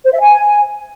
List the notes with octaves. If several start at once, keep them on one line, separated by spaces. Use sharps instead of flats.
C5
E5
G#5